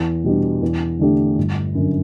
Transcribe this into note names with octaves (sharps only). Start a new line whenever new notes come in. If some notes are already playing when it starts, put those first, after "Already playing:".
Already playing: E2
B2 G3 D4
E2
D3 A3 D4 G4
G1
F#2 D3